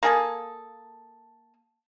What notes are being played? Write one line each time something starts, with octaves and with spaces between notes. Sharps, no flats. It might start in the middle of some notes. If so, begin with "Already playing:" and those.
A#3 G#4 A4